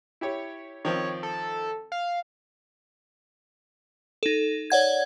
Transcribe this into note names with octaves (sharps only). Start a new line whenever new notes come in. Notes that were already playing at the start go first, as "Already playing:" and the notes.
E4 G4 C#5
D#3 F3 C4 C#5
A4
F5
D#4 A4
C#5 D5 F#5 G#6